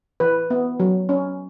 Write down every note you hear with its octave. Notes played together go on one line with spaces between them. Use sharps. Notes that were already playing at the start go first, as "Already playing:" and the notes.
E3 B4
B3
F#3
C#4